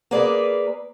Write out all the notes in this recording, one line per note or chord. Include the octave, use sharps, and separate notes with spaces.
A#3 G#4 A#4 B4 D5